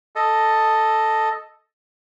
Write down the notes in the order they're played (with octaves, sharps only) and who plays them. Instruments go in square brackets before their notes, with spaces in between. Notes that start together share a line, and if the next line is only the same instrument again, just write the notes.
[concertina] A4 D#5